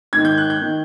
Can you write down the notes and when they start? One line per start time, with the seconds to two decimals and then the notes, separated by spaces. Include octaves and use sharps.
0.13 G#2 D#3 G#6
0.25 G6
0.38 F#6
0.50 G6
0.62 D#3